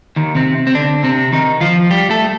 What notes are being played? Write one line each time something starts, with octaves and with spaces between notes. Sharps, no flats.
D#2 D#3
C3 C4
C4
D3 D4
C3 C4
D#3 D#4
F3 F4
G3 G4
A3 A4